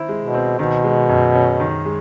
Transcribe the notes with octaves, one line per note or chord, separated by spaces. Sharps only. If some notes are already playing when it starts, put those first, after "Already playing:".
Already playing: D#3 C4 E4
G#3
B2
C4
B2 D#3
G#3
F#2
C#4
D#3
G#3